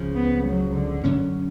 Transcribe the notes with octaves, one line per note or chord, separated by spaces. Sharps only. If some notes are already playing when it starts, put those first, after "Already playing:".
Already playing: C#2 C#3 F3
B3
F#3
D3
F#2 D3 F#3 C#4